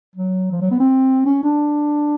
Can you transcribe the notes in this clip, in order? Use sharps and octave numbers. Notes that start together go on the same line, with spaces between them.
F#3
F3
F#3
B3
C4
C#4
D4